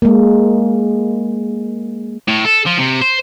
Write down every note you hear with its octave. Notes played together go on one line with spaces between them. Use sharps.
G#3 A#3
A2
A4
F3
C3
C5